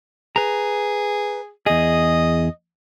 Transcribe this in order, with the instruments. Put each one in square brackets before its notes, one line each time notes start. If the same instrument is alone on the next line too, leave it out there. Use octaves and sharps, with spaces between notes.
[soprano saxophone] G#4 [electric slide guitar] B4 A#5
[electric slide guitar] E2 G#4 [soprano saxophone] D#5